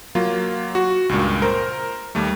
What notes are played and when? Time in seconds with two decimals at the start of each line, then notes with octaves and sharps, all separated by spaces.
0.15 F#3 A#3 F4
0.75 F#4
1.09 C#2 G2 A#2
1.42 A#4 C5
2.15 D#2 G3 A3